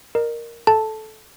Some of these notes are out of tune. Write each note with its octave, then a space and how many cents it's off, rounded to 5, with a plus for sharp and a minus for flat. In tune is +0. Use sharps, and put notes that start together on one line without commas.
A#4 +0 D#5 -40
A4 -15 A5 +0